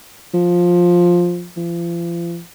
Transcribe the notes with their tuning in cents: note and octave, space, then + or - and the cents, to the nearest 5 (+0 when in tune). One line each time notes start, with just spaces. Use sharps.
F3 +10
F3 -40